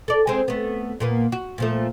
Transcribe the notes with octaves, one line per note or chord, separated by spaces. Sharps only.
A4 D5
G#3 C4
A3 B3
A#2 A#3 B3
F#4
A#2 F3 A3